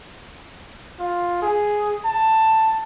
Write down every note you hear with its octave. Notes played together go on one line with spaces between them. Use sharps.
F4
G#4
A5